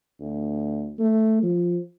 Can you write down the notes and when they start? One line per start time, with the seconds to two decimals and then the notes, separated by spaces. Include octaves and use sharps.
0.20 D2
0.98 A3
1.43 F3